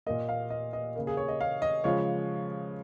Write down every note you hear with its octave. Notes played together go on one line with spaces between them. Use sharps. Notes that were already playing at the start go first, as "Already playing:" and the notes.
A#2 A#3 D#5
F5
D#5
D#5
C#3 A#3
G#4
C#5
D#5
F5
D#5
C#3 F3 G#3 C#5